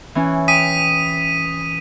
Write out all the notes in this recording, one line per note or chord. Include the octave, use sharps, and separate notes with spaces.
E3 C#4
G5 D#6 B6 D#7